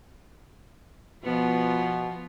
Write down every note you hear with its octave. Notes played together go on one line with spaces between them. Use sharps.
B2 F3 B3 F4